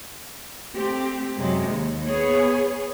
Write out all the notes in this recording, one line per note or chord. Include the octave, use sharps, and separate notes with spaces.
A3 C4 G4
F#2 C3 G#3
D#2
B3 G#4 C#5